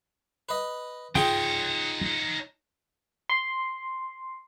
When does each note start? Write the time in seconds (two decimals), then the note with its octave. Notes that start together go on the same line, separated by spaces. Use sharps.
0.49 B4 D#5
1.15 D#4 F4 G#4 C#5 G5
3.29 C6